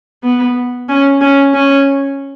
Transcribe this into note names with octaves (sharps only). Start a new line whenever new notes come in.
B3
C#4
C#4
C#4